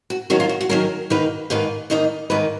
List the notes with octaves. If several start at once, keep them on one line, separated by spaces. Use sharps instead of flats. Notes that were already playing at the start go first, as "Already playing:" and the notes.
F#4
D#3 F#3 C#4 F#4
F4
F#4
F#4
D#3 F#3 C#4 A#4
G#2 D#3 A#3 D#4 B4
G#2 D#3 A#3 D#4 B4
G#2 D#3 A#3 D#4 D#5
G#2 D#3 A#3 D#4 B4